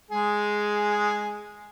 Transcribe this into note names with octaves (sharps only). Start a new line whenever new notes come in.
G#3 G#4